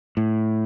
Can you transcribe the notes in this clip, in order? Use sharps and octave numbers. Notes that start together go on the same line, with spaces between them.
A2